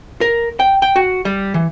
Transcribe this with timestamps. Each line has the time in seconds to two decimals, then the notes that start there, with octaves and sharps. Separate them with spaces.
0.21 A#4
0.60 G5
0.82 G5
0.96 F#4
1.25 G3
1.54 E3